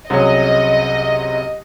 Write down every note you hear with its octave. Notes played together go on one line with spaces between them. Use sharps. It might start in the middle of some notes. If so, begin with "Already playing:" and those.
C2 C3 F#3 C#4 G#4 D#5